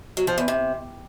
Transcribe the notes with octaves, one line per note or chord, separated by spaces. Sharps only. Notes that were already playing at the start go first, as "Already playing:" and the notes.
F#3
F3
E2
C3